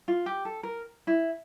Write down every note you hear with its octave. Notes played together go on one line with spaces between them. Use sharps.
F4
G4
A4
A#4
E4